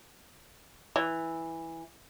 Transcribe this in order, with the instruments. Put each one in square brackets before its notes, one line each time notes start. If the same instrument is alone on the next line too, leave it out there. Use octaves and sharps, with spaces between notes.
[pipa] E3